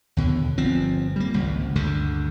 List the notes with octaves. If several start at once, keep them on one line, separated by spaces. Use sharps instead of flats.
D#2 B2 D3
G1 F3 C4
G3 A#3
G#1 C#2
D2 G2 D3